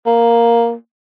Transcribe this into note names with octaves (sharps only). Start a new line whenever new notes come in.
A#3